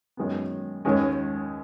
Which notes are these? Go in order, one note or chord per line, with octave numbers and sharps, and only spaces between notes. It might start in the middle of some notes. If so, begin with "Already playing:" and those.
F#2 D#3 G#3 B3
D#2 D#3 G#3 C#4